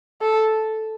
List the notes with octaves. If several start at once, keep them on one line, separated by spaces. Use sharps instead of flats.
A4